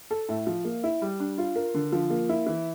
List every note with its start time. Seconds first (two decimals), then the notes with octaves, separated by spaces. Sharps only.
0.11 A4
0.29 A2
0.47 F3
0.65 A#3
0.84 E4
1.02 G3
1.20 D4
1.38 F4
1.56 A#4
1.74 D3
1.92 F3
2.10 A#3
2.29 E4
2.46 E3